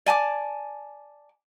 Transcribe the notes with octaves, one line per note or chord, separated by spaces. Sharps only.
D5 G#5 A5 D6